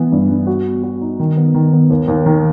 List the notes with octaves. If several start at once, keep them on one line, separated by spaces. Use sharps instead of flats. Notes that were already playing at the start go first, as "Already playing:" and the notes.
Already playing: E3 B3
G2
G2
F#4
B3
F#4
D#4
D#3
B3
D#3
B3
D#2
D#2
D#3